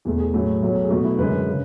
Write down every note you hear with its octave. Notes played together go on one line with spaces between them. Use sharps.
E2 B2 A3 G#4
G#4
A2 F#3 A3
B2 F#3 A3
G#4
B2 F#3 A3 F#4
E4
F#2 D3 G#3 B4
C#3